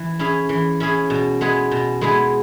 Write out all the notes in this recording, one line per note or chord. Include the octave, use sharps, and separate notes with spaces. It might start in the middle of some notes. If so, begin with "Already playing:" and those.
Already playing: E3
C#4 E4 G#4
E3
C#4 E4 G#4
B2
G#3 B3 E4 G#4
B2
G#3 B3 E4 G#4